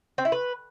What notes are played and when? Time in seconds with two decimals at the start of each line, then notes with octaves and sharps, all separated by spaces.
0.18 C4
0.25 E4
0.32 B4